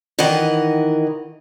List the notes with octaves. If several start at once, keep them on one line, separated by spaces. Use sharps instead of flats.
D#3 E3 A#4 D#5 F#5